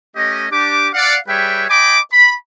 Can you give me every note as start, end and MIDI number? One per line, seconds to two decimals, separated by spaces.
0.16 0.46 57
0.16 0.46 61
0.16 0.46 67
0.16 0.46 75
0.51 0.89 62
0.51 0.89 67
0.51 0.89 86
0.94 1.17 74
0.94 1.17 77
0.94 1.17 78
1.28 1.65 55
1.28 1.65 68
1.28 1.65 71
1.28 1.65 73
1.28 1.65 76
1.28 1.65 79
1.70 1.99 75
1.70 1.99 79
1.70 1.99 80
1.70 1.99 83
1.70 1.99 86
2.13 2.33 83